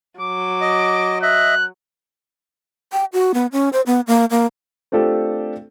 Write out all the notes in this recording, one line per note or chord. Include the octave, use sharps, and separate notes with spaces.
F#3 D6
D#5
D#5 E5 F#6
G5
F#4
B3
C#4
C5
B3
A#3
A#3
A3 C4 D4 F4 G4 A4